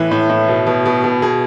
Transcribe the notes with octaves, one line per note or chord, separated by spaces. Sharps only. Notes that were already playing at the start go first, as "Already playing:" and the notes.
Already playing: A2 E3 B4
A2
A2
B2
B2
B2
B2
B2 G#4